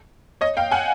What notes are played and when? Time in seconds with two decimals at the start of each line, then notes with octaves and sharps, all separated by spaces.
0.41 C#5 D#5
0.57 F5 G5
0.72 F#5 G#5